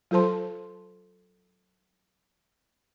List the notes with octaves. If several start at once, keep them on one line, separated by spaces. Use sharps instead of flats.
F#3 F4 A4 C5 A5 C6